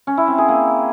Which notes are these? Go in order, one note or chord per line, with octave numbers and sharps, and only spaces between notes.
C#4
E4
C4
G#4
A#3